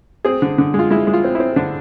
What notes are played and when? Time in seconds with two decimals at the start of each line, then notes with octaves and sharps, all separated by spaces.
0.25 C4 G#4
0.42 D3
0.58 D3
0.74 G#3
0.79 F4
0.90 G#3 E4
1.07 G#3
1.13 F4
1.24 C4
1.35 C4 E4
1.56 D3 D4